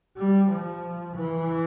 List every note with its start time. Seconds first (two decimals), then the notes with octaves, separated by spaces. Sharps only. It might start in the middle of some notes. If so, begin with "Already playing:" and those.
0.17 G3
0.50 F3
1.16 E3